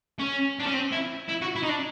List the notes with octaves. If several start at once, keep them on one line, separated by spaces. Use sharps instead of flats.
C#4
D4
C#4
C4
E4
E4
F#4
E4
D#4
D4